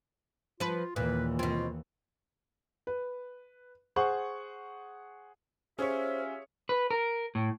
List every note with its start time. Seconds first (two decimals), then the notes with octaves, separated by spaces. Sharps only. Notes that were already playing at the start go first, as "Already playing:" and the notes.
0.60 F3 F4 B4
0.96 D#2 A#2 E3 B4
1.39 B2 C4 F4
2.87 B4
3.96 G#4 C5 F#5 C#6
5.79 C#4 F4 G4 G#4 C5 C#5 E5
6.69 B4
6.91 A#4
7.35 A2